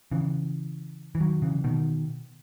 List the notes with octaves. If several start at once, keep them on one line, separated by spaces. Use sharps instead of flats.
C#3 E3
E3
D#3 F#3
C#3 E3
B2 D#3